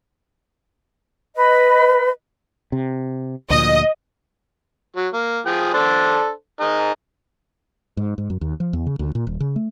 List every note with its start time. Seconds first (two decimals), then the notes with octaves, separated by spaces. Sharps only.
1.35 B4 D#5
2.72 C3
3.50 D2 A#2 F3 D#5
4.96 F#3
5.14 A#3
5.46 F3 G#4 G5
5.74 D4 A4 C5
6.61 D#4 G#4 A#4
7.97 G#2
8.18 G#2
8.30 F#2
8.41 D#2
8.60 F3
8.73 E2
8.87 C#3
8.99 D2
9.15 A#2
9.27 D#1
9.40 C#3
9.56 A3